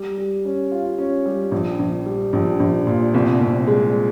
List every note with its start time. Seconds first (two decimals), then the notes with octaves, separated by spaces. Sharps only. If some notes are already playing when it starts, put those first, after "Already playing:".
Already playing: G3
0.18 G3
0.45 C#4
0.72 F4
0.99 C#4
1.26 G3
1.52 A#1
1.79 A#1
2.06 G3
2.33 A#1
2.60 A#1
2.87 A#2
3.14 C2
3.41 C2
3.67 G#3